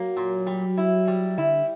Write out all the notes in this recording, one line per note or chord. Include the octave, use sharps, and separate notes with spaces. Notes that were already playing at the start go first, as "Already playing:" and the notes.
Already playing: F#3 A#3
A#2
G3
E4
G3
D3 E4